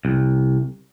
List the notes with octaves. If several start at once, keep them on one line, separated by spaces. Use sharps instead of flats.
C2